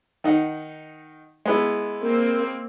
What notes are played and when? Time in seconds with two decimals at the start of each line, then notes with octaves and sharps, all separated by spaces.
0.24 D#3 D#4 F#5
1.46 G#3 B3 E4
2.02 A#3 C4